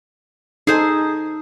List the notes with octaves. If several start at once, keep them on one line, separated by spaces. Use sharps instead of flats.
D#4 G#4 A4 C5 G#5